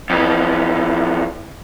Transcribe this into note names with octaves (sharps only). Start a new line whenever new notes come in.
F2 E3